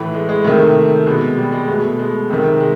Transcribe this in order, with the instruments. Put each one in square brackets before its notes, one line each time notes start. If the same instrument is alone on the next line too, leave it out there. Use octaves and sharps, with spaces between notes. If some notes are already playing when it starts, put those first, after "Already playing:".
Already playing: [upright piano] A2 E3 A3
G#3
G#3
C3 D#3 A3
B2 G#3
G3
G#3
B2 A3
G#3
C3 D#3
G#3